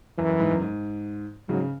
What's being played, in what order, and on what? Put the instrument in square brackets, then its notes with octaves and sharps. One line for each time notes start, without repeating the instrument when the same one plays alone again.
[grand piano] F#2 [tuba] E3
[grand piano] F#2
G#2
F#2
G#2
[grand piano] G#2 C#3 [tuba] F#3
[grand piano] C#3